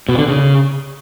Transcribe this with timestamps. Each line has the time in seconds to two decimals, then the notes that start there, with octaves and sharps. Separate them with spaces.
0.09 B2
0.18 D3
0.28 C#3